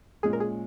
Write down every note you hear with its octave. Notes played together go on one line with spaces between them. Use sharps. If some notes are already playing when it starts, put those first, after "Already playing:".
A#2 G#3 C#4 G#4
A#4
G#4